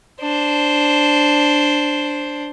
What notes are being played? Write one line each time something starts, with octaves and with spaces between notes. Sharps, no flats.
D4 C5